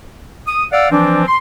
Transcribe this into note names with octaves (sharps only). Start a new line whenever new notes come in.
D#6
D5 F5 F#5 E6
E3 F3 C4 D4
C6